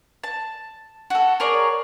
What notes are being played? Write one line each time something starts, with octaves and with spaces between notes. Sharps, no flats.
A5
F#4 A4
G#4 A#4 C#5 D5